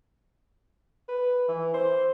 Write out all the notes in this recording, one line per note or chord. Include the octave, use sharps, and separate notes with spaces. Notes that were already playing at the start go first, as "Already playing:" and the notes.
B4
E3
C5